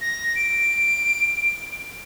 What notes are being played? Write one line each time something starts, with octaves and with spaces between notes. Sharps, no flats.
A#6
D7